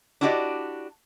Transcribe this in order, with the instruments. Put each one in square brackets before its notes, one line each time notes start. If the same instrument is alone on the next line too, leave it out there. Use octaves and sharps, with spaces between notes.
[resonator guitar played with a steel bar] D4 E4 F#4 G4 D5 D#5